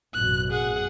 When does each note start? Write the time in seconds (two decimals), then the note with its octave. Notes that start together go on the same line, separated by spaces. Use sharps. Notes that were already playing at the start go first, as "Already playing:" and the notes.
0.14 A1 F#2 B2 F#6
0.50 G#4 F#5